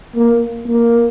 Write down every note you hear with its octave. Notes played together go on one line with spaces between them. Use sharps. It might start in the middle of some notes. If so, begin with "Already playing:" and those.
A#3
A#3